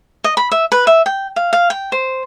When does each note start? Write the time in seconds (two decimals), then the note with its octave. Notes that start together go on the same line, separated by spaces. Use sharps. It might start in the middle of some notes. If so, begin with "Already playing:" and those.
0.24 D#5
0.37 B5
0.52 E5
0.72 B4
0.87 E5
1.06 G5
1.36 F5
1.53 F5
1.70 G5
1.92 C5